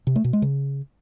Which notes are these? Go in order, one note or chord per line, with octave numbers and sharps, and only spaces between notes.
C3
A3
B2
G#3
C#3